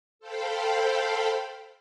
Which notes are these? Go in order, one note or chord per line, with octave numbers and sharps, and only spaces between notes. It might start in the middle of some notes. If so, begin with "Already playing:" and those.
A4 C5 F5 G5 B5